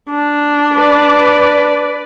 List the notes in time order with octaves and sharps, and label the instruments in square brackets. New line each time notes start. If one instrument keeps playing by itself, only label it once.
[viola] D4
[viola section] B4 D5